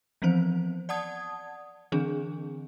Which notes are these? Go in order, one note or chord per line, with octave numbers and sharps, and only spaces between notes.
E3 F3 B3 C4 C5
D5 F#5 A5 D#6 G#6
D3 E3 C4 D4 G#4